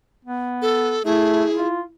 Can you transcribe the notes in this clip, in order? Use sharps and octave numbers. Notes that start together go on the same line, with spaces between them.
B3
A4
A3 E4 G#4
F4